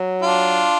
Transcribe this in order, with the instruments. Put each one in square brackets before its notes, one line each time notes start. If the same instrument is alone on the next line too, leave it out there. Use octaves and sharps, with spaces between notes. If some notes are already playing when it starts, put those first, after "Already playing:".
Already playing: [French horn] F#3
[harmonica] D4 F4